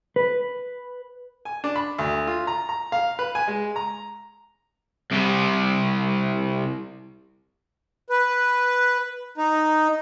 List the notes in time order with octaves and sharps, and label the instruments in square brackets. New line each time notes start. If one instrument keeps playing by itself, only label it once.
[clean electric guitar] B4
[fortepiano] G#5
D4
B5
D2
F4
A#5
A#5
F5
B4
G#5
G#3
A#5
[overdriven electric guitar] C2 C3
[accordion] B4
D#4